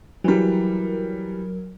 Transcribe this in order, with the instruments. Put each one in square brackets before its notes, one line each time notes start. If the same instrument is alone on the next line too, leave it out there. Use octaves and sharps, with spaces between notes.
[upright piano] E3 G3 [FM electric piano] F#3 A#4